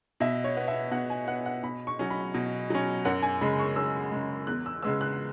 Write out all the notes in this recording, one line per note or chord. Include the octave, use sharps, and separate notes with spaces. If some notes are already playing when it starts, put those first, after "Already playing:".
B2 E5
C#5
B3
E5
B2 F#5
G#5
B3 F#5
F#5
B2 B5
C#6
F#3 C#4
B5
B2
F#3 C#4
F#2 F#5
G#5
C#3 G#3 B5
C#6
F#2 E6
C#3 G#3
E2 F#6
E6
C#3 G#3 B3 E6
F#6